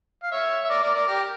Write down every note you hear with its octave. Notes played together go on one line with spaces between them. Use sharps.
F5
C#5 E5
E5
A#4 D5
A#4 D5
A#4 D5
G4 A#4